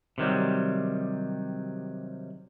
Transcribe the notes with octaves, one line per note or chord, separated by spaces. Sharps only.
C3 D#3 F#3 G3